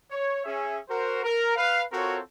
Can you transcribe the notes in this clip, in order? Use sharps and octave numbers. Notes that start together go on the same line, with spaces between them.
C#5
C#4 G#4 E5
F#4 A#4 C5
A#4
B4 F5
C4 F4 F#4 A4 A#4 C#5